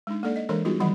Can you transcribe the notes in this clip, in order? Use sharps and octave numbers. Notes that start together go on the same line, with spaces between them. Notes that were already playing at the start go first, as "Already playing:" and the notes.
G#3 D4 D#4
A#3 D4 A4 D5
D#5
E3 G#3 D4 A4 A#4 C#5
G3 B3 D#4 F4 F#4 G#4
D#3 E3 F#3 G3 F#5 B5